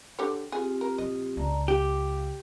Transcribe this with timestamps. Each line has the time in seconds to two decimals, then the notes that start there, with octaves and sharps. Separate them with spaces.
0.19 D3 G4 C#5
0.52 C4 F4 G4 G#4
0.81 A#4
0.98 A#1 D#5
1.37 C#2 D5 A5 A#5
1.68 G4 F5 D6